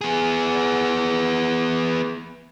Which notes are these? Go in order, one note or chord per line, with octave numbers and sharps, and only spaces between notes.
B3 G#4